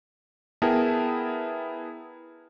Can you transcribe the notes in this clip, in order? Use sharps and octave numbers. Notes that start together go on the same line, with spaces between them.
B3 E4 G#4 A#4 G5 A5